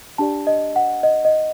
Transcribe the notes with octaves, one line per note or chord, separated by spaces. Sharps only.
D4 G4 D5 A5
D#5
F#5
D#5
D#5